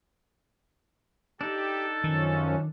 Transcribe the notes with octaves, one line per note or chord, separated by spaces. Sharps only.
D4 D#4 G4 A4
F#2 D#3 F3 C#4